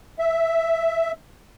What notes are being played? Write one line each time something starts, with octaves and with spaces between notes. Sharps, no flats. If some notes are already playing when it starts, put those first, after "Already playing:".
E5